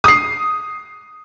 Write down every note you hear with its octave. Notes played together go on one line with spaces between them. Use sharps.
D#6 C7